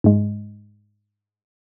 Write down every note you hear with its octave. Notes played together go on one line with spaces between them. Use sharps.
G#2 G#3